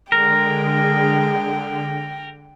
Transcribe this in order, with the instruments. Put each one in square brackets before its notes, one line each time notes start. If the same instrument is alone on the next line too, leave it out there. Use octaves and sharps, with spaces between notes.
[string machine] D3 [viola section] G#3 G#4 [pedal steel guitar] A#4 [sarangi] G5